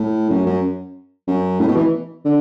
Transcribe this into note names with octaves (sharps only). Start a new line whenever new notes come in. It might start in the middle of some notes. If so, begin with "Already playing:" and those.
Already playing: A2
F#2
F#2
F#2
A2
B2
E3
D3